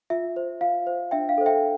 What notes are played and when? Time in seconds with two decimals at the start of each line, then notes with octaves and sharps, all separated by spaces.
0.10 F4 E5
0.36 C5
0.61 F4 F5
0.87 C5
1.11 D4 E5 G5
1.29 F5
1.38 A4 C5
1.46 E5 G5